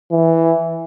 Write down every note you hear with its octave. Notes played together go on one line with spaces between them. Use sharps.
E3